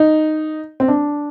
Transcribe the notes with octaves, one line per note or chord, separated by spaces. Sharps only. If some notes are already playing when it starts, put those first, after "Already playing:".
Already playing: D#4
C4
D4